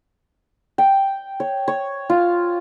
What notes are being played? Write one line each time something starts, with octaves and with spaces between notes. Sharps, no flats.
G5
C#5
C#5
F4